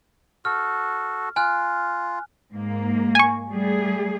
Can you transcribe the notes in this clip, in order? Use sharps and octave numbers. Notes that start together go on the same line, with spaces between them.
F#4 A4 F6
F4 G#5 F6 F#6
G#2 A#3
G#5 C#6
G3 A3 G#4